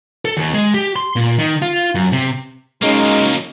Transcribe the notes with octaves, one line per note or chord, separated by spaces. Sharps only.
A4
D#2
G#3
G4
C6
A#2
D#3
F4
F#2
C3
F#3 G#3 A#3 C#4 D#4